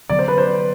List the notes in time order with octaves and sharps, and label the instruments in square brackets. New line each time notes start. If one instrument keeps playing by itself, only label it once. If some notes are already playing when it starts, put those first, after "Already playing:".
[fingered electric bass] D3 F#3 B3 [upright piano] D5
[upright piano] C5
B4
C5